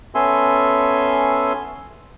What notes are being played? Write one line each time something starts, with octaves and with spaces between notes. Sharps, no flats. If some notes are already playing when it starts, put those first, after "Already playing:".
B3 C#4 A4 E5 G#5 C6